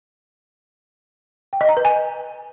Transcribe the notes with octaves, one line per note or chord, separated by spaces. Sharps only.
G5
D#5
A#5
B4
G#5